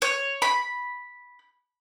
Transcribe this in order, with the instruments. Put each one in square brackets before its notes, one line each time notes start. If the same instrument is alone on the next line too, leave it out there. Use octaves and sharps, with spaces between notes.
[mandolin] C#5
B5